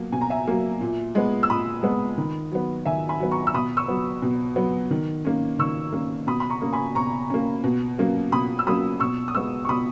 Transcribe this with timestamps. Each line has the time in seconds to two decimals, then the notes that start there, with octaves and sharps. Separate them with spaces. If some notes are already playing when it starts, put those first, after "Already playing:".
Already playing: B2 F#3 A#3
0.12 B2 G#5
0.21 A#5
0.30 E5 G#5
0.48 F#3 A#3
0.81 A#2
1.15 G#3 B3
1.43 E6
1.50 A#2 B5 D#6
1.83 G#3 B3
2.18 D#3
2.52 F#3 B3
2.86 D#3 E5 G#5
3.09 G#5 B5
3.20 F#3 B3
3.31 A#5 C#6
3.47 E6
3.54 B2 B5 D#6
3.77 C#6 E6
3.88 F#3 B3
4.22 B2
4.56 F#3 B3
4.91 D#3
5.25 A#3 C#4
5.59 D#3 C#6 E6
5.93 A#3 C#4
6.27 B2 B5 D#6
6.40 B5
6.49 A#5 C#6
6.61 A#3 C#4
6.73 G#5 B5
6.95 B2 A#5 C#6
7.30 A#3 C#4
7.64 B2
7.98 F#3 A#3 C#4
8.32 B2 B5 D#6
8.59 E6
8.67 F#3 A#3 C#4 B5 D#6
9.00 B2 C#6 E6
9.28 D#6
9.35 G#3 B3 C#6 E6
9.65 C#6
9.69 B2 B5 D#6